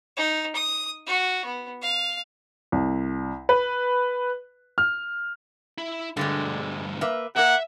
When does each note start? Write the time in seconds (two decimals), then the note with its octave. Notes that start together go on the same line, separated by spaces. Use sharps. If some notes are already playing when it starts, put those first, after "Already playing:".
0.17 D#4
0.55 D#6
1.07 F#4
1.45 B3
1.82 F5
2.72 C2
3.49 B4
4.78 F6
5.78 E4
6.17 D2 G2 D3 G3 G#3
7.01 A#3 B4 E5
7.36 A#3 A#4 E5 F#5